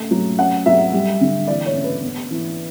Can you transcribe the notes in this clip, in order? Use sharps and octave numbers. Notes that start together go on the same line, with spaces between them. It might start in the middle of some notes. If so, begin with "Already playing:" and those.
Already playing: C#3 A3
F#3
C#4 F#5
F#3 E5
G3
D3
E3 D5
C#5
C#3
B4
B3
E3